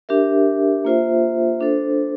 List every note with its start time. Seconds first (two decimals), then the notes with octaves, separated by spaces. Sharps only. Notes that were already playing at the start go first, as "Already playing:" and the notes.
0.09 D4 G4 A#4 E5
0.85 A#3 F4 C5 E5
1.61 D4 A4 C5